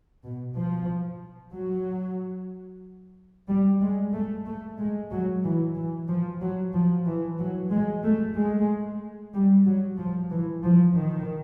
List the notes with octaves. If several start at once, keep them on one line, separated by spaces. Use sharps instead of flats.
B2
F3
F#3
G3
G#3
A3
A3
G#3
F#3
E3
E3
F3
F#3
F3
E3
F#3
G#3
A3
G#3
G3
F#3
F3
E3
F3
D#3